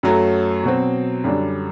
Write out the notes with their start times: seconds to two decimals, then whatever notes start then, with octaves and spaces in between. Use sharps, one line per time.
0.03 F#2 F#3 A3
0.63 B2 F#3 C4
1.24 F#2 D3 G3 D4